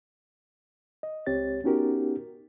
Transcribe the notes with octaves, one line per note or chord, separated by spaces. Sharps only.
D#5
C#2 C4 G4 C#5 A6
B3 C#4 D#4 F#4 G4 A#4